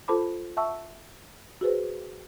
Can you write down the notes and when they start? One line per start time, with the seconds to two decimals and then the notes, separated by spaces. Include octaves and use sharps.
0.08 F4 A4 C5 A5 B5 D6
0.57 E5 F#5 A5 C#6 E6
1.61 F#4 G#4 B4 C5